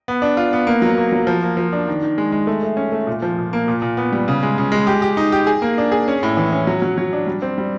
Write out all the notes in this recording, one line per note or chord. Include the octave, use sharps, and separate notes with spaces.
B3
D4
F4
B3
A#3
F#3
A#3
F#3
F3
A#3
F3
D4
D#3
D#3
G#3
G#3
A3
A3
C#4
A3
A#2
F3
A#2
A#3
A#2
A#2
B3
G3
C#3
G#3
C#3
G#3
G4
G4
D#4
G4
G#4
A#3
D4
G#4
C#4
A2
E3
C#4
F#3
F#3
F#3
D4
G3
C4
G3